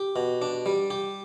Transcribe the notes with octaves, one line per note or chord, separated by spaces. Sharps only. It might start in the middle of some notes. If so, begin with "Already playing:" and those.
Already playing: G4
B2
D4
G3
G4